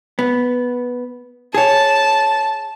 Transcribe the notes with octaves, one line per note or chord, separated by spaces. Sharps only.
B3
G#4 C#5 A5